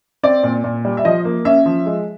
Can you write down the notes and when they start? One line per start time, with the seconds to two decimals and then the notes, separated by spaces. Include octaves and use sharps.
0.23 C4 D5
0.44 A#2
0.64 A#2
0.85 G3
0.97 E5
1.05 F3 D#5
1.25 A#3
1.45 C#4 E5
1.66 F3
1.86 G#3